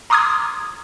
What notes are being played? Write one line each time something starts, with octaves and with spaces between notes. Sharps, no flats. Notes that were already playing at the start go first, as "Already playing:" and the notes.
A#5 C6 D6 D#6 F6 G#6